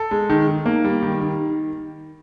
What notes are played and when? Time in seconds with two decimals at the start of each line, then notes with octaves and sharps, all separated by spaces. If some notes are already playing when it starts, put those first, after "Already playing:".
Already playing: A4
0.11 G#3
0.30 D#3
0.48 D#3
0.66 A#3
0.84 G3
1.02 D#3
1.21 D#3